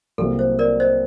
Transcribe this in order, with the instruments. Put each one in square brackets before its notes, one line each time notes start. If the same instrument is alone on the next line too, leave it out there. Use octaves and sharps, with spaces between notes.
[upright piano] C2 C3 F#3 A#3 [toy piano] A4
[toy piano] C5
A#4 D5
C5 D#5